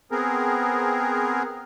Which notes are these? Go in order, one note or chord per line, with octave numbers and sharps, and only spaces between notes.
B3 C4 G#4 A#4